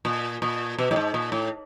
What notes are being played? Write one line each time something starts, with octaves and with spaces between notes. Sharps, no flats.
A#2
A#2
B2
A2
G#2
A#2
A2